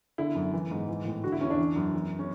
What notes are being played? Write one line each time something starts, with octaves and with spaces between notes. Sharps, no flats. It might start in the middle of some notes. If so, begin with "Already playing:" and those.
D3 E4
F#2
E3
G#2
E3
A2
D3 F#4
E4
E2 C#4
D4
E3
F#2
E3
C#4